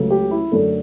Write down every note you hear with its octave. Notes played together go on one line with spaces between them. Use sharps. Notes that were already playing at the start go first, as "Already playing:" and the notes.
Already playing: C#2 C#3 F#3 A3
G4
E4
F#2 D3 A3 D4 A4